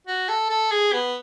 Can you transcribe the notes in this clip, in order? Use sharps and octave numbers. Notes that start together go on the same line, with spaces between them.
F#4
A4
A4
G#4
B3